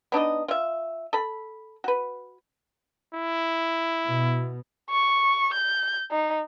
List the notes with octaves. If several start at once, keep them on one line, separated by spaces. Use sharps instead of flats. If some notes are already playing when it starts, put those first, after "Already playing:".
B3 D4 D#4 D#5
F4 E5
A4 B5
F#4 B4
E4
B2
C#6
G6
D#4